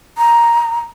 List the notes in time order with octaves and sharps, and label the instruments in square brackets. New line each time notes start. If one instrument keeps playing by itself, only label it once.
[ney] A#5